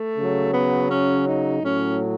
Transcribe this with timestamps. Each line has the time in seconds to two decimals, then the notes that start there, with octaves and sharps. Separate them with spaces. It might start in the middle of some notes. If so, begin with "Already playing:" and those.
Already playing: A3
0.17 C#3 F#3
0.54 B3
0.89 C#4
1.26 D#4
1.62 A2 F#3 C#4